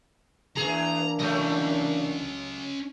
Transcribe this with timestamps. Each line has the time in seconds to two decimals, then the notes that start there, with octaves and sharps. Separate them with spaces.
0.57 E2 E3 A#3 D4 G#4 A#5
1.19 F#3 A3 C#4 D#5